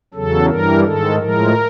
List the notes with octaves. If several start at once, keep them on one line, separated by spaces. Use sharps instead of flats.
E2 C#3 F#3 A4
G2 E3 G3 A#4
G#2 D#3 G#3 A4
A2 F3 G#3 A#4